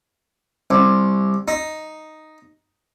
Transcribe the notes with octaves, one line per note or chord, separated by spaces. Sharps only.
C2
D#4